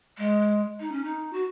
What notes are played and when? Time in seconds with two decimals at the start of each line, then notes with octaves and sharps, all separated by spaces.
0.17 G#3
0.80 D#4
0.92 C#4
1.04 D#4
1.33 F#4